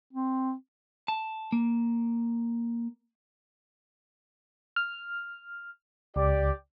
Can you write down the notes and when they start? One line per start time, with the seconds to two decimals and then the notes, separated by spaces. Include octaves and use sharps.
0.13 C4
1.08 A5
1.52 A#3
4.76 F6
6.16 C#2 G4 D5